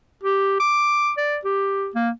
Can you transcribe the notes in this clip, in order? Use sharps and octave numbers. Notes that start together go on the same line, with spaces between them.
G4
D6
D5
G4
A#3